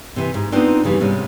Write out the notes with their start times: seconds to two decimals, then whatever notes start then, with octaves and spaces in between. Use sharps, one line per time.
0.16 C3 E3
0.34 G#2
0.52 B3 C4 D4 D#4 F4
0.84 F2 C#3 E3 G3
1.00 G#2 C3 G3 G#3 C#4